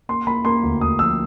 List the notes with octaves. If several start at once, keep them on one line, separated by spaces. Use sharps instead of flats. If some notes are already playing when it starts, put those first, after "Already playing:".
A#3 C6
A#3 B5
A#3 C6
D2
D2 D#6
F3 E6